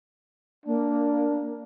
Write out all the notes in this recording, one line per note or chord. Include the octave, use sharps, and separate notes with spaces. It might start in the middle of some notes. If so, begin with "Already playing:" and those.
A#3 D4